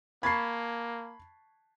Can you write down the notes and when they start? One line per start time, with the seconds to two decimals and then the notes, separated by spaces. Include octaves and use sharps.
0.23 A#3 A5 B5 C#6 G#6 C7